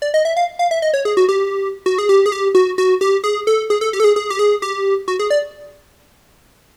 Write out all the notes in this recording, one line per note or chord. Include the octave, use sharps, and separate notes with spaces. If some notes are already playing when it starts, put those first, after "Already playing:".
D5
D#5
E5
F5
F5
E5
D#5
C#5
G#4
F#4
G4
F#4
G#4
G4
G#4
G4
F#4
F#4
G4
G#4
A4
G#4
A4
G4
A4
G#4
G#4
G4
G#4
G4
F#4
G#4
D5